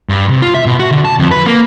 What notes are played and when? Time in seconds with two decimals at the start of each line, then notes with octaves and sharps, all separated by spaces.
0.09 G2
0.29 C3
0.42 F4
0.54 E5
0.66 B2
0.80 F#4
0.91 D3
1.05 A5
1.19 F2
1.31 B4
1.46 A#3